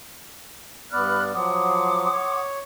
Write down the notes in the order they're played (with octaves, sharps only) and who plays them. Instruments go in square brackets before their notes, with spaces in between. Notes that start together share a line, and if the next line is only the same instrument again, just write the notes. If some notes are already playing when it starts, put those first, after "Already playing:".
[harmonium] G2 B3 D5 [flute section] B5 F6 F#6
[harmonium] F3 F#3 [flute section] F#5 C6 D#6 [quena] D6
[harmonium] C#5